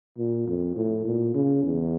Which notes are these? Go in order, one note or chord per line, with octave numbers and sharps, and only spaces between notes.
A#2
F2
A2
A#2
C#3
E2